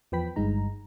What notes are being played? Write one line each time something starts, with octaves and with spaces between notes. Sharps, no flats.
E2 F3 B4 G5 B5 B6
G1 G2 G#3 D#4 A#5